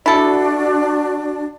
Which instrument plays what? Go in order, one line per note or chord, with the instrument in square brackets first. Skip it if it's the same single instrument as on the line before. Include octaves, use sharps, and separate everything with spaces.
[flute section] D4 F#4 D5 [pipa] E4 A4